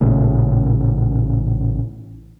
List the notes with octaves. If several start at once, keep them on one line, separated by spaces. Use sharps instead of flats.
A1 A#2 C#3 A3